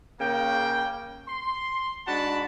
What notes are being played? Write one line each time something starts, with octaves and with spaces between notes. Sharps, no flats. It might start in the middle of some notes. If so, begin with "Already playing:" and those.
C#3 A#3 G5
C6
G#2 D4 F#4 F#5 A5 B5